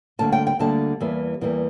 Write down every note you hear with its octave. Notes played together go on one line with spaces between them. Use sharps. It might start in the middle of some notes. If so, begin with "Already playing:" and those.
D2 D3 G3 A#3 A5
G5
G5
D2 D3 G3 A#3 A5
E2 E3 G3 A#3
E2 E3 G3 A#3